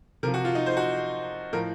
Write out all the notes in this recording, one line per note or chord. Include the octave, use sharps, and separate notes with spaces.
C3 F3 A#4
F#4
F4
D#4
C5
F#4
A2 F3 A#4